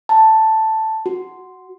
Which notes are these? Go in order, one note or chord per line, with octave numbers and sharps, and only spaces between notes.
A5
F#4